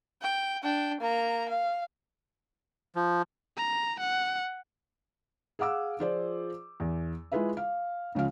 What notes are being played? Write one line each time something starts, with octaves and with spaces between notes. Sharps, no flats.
G5
D4 G5
A#3 A#5
F5
F3
A#5
F#5
G#4 F5 F#5 D6 E6
F3 F4 G#4 C5 D5
E2
G#3 E4 F4 G#4 B4 E5
F5
C#2 C#3 F3 F5